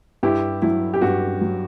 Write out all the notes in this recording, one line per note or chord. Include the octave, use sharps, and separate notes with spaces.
G2 E4 G4
F#3 E4
G4
G2 F#4
F#3